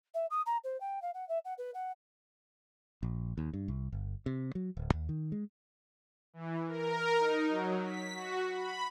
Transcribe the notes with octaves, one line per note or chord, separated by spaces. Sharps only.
E5
D#6
A#5
C5
G5
F5
F#5
E5
F#5
B4
F#5
A#1
D#2
G2
C2
G1
C3
F#3
D1
D#2
D#3
G#3
E3
A#4
D#4
F#3
B6
F#4
B5